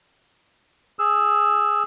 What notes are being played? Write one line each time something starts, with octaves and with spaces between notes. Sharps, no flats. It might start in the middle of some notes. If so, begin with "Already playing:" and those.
G#4 E6